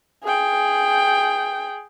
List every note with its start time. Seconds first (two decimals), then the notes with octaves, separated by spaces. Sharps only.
0.24 G#4 G5